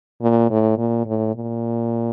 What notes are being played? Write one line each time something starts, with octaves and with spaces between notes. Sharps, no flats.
A#2
A2
A#2
A2
A#2